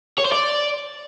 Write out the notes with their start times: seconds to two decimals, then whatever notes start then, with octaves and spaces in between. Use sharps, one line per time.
0.19 C#5
0.25 C5
0.32 D5